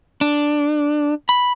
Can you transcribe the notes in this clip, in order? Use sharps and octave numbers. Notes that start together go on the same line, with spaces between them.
D4
B5